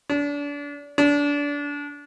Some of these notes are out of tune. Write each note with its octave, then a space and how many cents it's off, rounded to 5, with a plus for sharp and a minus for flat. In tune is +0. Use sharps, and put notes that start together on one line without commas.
D4 -30
D4 -25